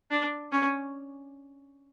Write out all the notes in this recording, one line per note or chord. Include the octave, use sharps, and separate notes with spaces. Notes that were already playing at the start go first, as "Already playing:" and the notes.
D4
C#4